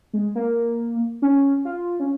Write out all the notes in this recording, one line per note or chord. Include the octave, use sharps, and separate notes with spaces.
G#3
A#3
C#4
F4
C#4